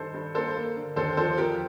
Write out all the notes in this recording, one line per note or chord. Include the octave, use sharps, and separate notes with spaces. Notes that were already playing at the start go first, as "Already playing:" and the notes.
Already playing: G2 D#3 A4 C5
G2
A#3 A4 C5
A#3
D3
D#2 A4 C5
F3 A4 C5
F2 G4 A#4